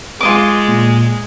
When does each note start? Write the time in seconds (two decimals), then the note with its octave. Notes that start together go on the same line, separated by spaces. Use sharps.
0.21 G#3 F4 D#5 D6
0.68 A#2